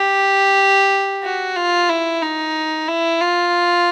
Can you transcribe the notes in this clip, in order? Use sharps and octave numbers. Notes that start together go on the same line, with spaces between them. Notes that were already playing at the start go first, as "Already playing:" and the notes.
Already playing: G4
F#4
F4
E4
D#4
E4
F4